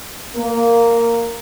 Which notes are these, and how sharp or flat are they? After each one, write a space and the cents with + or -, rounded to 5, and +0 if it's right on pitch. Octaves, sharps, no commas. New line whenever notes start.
A#3 -5